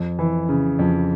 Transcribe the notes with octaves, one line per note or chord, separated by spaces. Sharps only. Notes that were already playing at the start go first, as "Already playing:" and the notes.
Already playing: F2
E3
C#3
F2